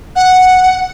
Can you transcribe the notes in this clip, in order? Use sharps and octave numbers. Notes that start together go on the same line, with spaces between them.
F#5